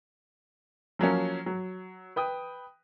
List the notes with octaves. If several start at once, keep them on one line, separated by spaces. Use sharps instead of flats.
F3 F#3 A#3 C#4
F#3
B4 G5 D#6